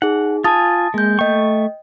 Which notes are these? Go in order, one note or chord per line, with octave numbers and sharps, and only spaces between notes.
D#4 G#4 F#5
F4 G#5 A5 D#6 A6
G#3 A#3 G6
A3 D#5 G5 C#6